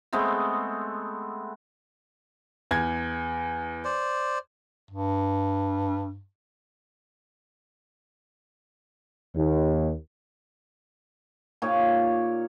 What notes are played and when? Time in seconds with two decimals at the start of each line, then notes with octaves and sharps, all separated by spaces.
0.13 G#3 A3 B3 C4
2.71 E2 G#6
3.85 C5 D5
4.91 G2
9.36 D#2
11.62 A#2 D#4 G4 C#5